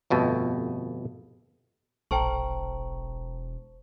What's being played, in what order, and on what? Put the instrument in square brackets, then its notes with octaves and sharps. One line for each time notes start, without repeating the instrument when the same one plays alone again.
[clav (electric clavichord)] G1 F2 B2 A3
[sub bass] E1 [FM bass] A#1 [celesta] A4 G5 A#5 [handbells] C5 A5 C#6